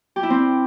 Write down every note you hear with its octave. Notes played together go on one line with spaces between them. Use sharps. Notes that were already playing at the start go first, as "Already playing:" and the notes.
G4
E4
C4